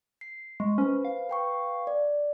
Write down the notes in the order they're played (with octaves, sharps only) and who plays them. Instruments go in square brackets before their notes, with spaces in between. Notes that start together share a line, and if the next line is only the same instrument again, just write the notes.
[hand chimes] C7
[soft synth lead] G#3 [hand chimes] C#6
[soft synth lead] C#4 [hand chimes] B4 C5
[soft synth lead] F5
[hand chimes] B4 G5 C#6
D5